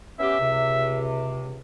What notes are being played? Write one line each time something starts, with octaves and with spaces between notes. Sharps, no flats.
B3 C#4 G4 E5
C#2 C3